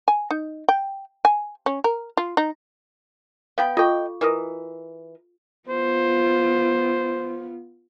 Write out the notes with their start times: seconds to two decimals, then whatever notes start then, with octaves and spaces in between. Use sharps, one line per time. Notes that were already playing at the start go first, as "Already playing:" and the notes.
0.08 G#5
0.31 D#4
0.69 G5
1.25 G#5
1.66 C#4
1.84 A#4
2.17 F4
2.37 D#4
3.58 B3 F5 G5 B5
3.77 F4 A4 D#5 G5 C#6
4.21 E3 A#4 D#5
5.69 B3 F4 C5